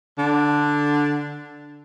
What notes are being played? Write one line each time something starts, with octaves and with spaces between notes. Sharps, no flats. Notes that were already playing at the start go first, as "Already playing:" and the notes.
D3